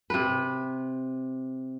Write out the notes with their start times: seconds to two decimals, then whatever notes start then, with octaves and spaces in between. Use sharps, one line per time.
0.10 C3 B4